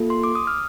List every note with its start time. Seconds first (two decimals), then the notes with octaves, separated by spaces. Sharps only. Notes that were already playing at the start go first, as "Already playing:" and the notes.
Already playing: A#3 F4 A4
0.10 C6
0.24 D6
0.35 D#6
0.47 F6